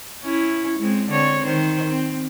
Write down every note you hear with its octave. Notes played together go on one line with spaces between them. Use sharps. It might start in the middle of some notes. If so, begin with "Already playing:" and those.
C#4 E4
G#3 C4
D3 C4 C#5
D#3 C5
C4